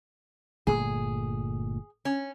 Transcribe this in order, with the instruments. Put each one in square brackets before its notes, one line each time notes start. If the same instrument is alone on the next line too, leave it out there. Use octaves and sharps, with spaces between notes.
[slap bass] G1 A#2 A3 [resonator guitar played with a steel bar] G#4
[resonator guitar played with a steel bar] C#4